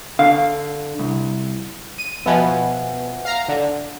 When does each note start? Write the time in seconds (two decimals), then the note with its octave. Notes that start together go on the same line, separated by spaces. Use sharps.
0.19 D3 F5
0.99 C2
1.98 D#7
2.26 B2 F3 B3 E5 F#5 G#5
3.25 F5 A#5
3.48 D3